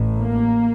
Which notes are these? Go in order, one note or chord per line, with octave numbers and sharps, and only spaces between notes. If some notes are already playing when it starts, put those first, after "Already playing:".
Already playing: A1 A2
A#3